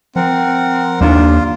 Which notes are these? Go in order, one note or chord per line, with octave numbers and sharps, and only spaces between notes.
F3 C4 A#4 F#5
D#2 D4 F4